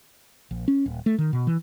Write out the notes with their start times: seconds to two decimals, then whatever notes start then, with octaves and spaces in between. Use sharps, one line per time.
0.51 A#1
0.68 C#4
0.86 D#1
1.06 A3
1.18 D#3
1.33 B2
1.47 E3